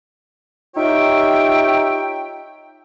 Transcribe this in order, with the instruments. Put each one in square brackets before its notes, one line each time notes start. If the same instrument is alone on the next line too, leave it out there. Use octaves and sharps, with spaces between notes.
[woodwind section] D#4 F4 G4 C#5 E5 G5